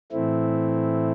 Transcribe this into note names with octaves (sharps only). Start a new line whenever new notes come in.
A2 E3 A3 C4 E4